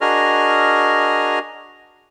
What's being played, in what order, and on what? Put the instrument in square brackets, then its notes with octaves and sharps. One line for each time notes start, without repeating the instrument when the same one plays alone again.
[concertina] D4 F#4 G#4 A#4 D#5 F6